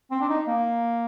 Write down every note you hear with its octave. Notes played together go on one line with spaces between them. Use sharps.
C4
D4
D#4
A#3